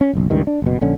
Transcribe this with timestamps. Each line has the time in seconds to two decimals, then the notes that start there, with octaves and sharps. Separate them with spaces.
0.01 C#4
0.13 F#1 B1
0.30 C#2 G2 D#3
0.47 D4
0.62 F#1 B2
0.81 A#1 D3 C#4